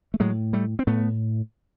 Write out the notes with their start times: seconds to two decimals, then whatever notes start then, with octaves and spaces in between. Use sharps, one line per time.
0.14 A3
0.20 A2 F#3 G#3
0.53 G3 A3
0.79 C4
0.87 A2 A3 B3